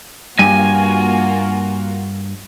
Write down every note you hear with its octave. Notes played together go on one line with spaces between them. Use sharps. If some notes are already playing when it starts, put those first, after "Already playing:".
G2 A#3 F4 F#4 G#5